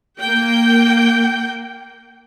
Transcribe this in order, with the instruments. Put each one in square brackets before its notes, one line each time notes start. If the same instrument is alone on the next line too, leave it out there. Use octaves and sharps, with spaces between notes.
[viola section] A#3 G5